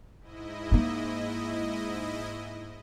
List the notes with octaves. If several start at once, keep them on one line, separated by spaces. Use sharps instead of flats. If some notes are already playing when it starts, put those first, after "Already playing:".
G#2 E4 D#5
A#3 D#4